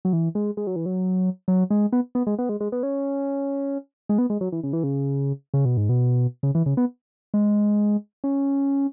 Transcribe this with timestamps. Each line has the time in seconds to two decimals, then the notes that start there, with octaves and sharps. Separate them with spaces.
0.05 F#3
0.13 E3
0.35 G#3
0.57 G#3
0.67 F#3
0.76 E3
0.86 F#3
1.48 F#3
1.70 G#3
1.93 B3
2.15 B3
2.27 G#3
2.39 B3
2.49 G#3
2.60 G#3
2.72 B3
2.83 C#4
4.09 G#3
4.18 B3
4.30 G#3
4.41 F#3
4.52 E3
4.63 C#3
4.73 E3
4.84 C#3
5.54 C#3
5.65 B2
5.77 G#2
5.89 B2
6.43 C#3
6.55 E3
6.66 C#3
6.77 B3
7.34 G#3
8.24 C#4